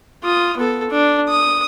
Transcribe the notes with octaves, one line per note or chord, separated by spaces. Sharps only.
F4 D#6
B3 A4
D4
D#6